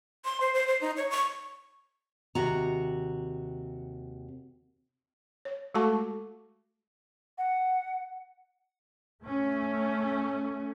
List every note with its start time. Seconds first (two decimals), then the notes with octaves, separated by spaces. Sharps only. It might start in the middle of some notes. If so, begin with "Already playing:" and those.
0.25 C6
0.41 C5
0.54 C5
0.68 C5
0.81 D#4
0.97 C#5
1.10 C#6
2.35 D#2 C3 F#4 A#5
5.45 C#5
5.74 G#3 A3 F#4 A4 A5 C#6
7.38 F#5
9.23 A3 C#4